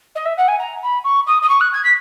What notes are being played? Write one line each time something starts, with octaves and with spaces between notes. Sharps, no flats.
D#5
E5
F#5
G#5
A#5
B5
C#6
D#6
D#6
C#6
F#6
G#6
B6